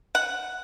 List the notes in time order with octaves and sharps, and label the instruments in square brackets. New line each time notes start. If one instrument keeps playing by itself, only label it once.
[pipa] F#5